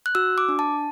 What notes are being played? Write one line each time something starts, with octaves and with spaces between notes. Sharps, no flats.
F#6
F#4 E6
D6
D4
A5